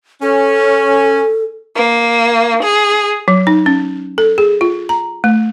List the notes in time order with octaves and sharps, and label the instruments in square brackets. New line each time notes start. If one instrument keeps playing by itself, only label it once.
[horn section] C#4 [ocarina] A4
[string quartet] A#3
G#4
[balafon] F#3
D#4
C#4
A4
G#4
F4
A#5
A3